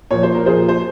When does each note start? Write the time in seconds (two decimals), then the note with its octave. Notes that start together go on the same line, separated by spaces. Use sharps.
0.11 A#2 F3 C#5
0.23 C5
0.35 A#4
0.45 A#2 F3 G#4 C5
0.68 C5